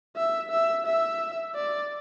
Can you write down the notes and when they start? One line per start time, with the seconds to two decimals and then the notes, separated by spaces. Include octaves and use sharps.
0.17 E5
0.51 E5
0.86 E5
1.55 D5